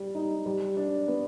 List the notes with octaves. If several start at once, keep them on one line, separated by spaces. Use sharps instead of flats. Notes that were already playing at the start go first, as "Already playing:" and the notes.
Already playing: G3
D#4
G3
D4
B3